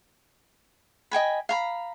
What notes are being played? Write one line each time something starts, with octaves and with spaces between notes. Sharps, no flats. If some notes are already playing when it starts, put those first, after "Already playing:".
D#5 G5 G#5 B5
F5 A#5 B5